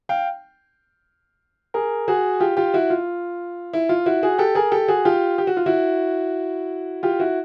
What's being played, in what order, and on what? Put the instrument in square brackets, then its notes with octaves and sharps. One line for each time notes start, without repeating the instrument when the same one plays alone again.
[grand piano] F5 G5
G#4 A#4
F#4 G#4
F4 G4
F4 G4
E4 F#4
F4
E4
F4
E4 F#4
F#4 G#4
G4 A4
G#4 A#4
G4 A4
F#4 G#4
F4 G4
G4
F#4
F4
E4 F#4
F4 G4
E4 F#4